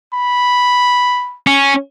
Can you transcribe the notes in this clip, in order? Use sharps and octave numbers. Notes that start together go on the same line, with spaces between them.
B5
C#4